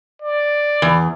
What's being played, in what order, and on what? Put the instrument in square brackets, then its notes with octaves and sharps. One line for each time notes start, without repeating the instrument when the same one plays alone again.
[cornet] D5
[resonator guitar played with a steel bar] E2